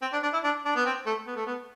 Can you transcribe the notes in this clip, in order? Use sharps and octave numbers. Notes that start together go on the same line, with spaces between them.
C4
D4
D4
E4
D4
D4
B3
C4
A3
B3
A3
B3